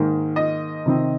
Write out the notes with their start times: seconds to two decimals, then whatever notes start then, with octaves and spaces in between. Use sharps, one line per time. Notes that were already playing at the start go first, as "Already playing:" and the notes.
Already playing: G#2 D#3 A#3
0.36 D#5
0.86 C3 D#3 C4